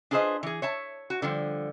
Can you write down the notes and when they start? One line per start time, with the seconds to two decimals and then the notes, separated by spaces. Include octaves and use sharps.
0.11 D4 F4 G#4 B4 C5 D#5
0.43 E3 G#4
0.62 C#5 E5 A5
1.10 F#4
1.22 D3 F3 G3